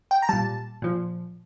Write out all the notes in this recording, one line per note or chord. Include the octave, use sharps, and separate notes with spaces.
G5
A#5
A#2 G3 A5
A#2 F3